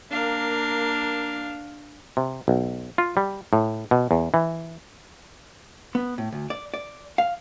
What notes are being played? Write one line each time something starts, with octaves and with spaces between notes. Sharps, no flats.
A#3 D4 A#4 F5
C3
B1
F4
G3
A2
B2
E2
E3
B3
A2
D2
D5
D5
F5